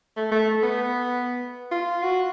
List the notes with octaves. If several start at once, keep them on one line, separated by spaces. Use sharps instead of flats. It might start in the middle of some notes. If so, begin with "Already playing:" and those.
A3
A3
B3
F4
F#4